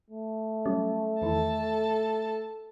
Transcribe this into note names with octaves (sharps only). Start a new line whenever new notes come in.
A3
F#3 G3 C#4
E2 D#3 E3 A4 A5